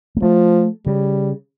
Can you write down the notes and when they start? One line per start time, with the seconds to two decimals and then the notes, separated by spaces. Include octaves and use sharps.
0.17 A#3
0.22 F3 A3
0.86 C#3 G3